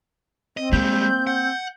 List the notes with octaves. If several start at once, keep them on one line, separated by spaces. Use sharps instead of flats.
C4 D#5
G3 G#3 A#3 G6
F#5